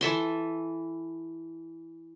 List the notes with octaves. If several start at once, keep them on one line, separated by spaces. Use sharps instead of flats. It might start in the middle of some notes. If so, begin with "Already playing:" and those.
E3 A4 E5 C6